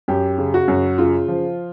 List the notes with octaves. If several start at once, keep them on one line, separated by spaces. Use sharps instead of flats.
F#2 G4
C#3
F#4
F#2
C#3 F4
F3